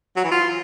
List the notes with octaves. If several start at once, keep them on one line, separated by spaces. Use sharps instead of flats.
F#3
E3
F4